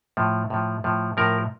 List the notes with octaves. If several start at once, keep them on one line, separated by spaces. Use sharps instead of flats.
A2 F3
A2 F3
A2 F3
A2 F3 A#4